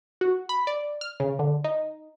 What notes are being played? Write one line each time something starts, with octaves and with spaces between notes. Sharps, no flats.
F#4
B5
D5
F6
C#3
D3
D#4